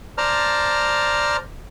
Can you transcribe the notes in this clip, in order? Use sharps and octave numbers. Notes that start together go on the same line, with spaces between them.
C5 D5 A5 A#5 F6